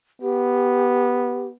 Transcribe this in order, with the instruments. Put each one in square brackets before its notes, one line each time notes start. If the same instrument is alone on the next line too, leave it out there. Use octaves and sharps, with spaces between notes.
[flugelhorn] B3 [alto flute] G4